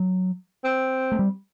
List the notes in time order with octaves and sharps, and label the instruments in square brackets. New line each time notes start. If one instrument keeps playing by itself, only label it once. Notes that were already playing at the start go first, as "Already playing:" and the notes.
Already playing: [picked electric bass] F#3
[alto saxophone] C4
[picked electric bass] A3
G3